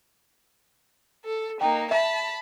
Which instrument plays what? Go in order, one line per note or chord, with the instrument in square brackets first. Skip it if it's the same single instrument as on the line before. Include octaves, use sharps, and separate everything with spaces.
[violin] A4
[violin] A#3 D#4 [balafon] G5
[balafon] E5 [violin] A5 B5